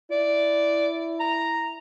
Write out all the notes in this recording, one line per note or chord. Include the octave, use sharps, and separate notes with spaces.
E4 D5
A#5